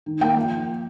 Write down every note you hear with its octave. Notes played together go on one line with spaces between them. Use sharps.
D#3
A#3 G5
F3